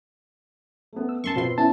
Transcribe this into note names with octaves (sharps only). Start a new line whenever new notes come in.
A3 B3
E6
F#2 A5 C6 C#6
B2 F3 C4 B4 C6
B3 C#4 E4 A5